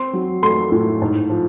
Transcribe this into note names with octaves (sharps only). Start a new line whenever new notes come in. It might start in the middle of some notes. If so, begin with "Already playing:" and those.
Already playing: C4 C6
F#3
A3 C6
A2
G#2
F3